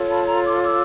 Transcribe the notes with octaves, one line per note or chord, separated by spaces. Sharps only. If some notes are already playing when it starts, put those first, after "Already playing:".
Already playing: F4 A4 C#5
A5 B5
A#5 C6
C6 D6
D6 E6